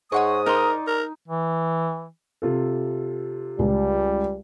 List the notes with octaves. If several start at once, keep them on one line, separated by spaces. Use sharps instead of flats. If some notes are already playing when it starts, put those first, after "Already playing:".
G#2 G#3 C#5 F#5 C#6 D#6
D#4 A#4 D5 C6
A#4
E3
C3 F4 A4
C#2 G3